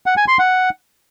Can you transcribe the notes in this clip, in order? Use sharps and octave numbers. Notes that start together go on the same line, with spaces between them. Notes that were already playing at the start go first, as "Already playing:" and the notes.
F#5
G#5
C6
F#5